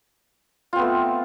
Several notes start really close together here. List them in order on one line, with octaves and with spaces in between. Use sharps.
F4 C4 B3 A3